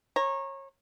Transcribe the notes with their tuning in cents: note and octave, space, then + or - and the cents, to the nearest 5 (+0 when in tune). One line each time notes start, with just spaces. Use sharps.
C#5 -25 A#5 +0